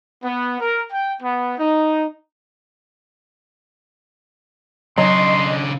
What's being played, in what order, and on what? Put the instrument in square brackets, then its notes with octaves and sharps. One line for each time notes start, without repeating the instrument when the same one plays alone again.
[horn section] B3
A#4
G5
B3
D#4
[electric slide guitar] C#3 D4 [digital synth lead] F#3 [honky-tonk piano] D#5 [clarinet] C6